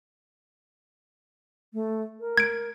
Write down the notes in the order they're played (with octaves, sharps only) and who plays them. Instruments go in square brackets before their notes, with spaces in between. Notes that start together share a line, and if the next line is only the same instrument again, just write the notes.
[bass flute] A3
A#4
[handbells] G#6 D7